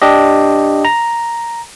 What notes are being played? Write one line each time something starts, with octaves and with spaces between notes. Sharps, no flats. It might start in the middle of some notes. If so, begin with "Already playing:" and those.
D4 G4 D#5
A#5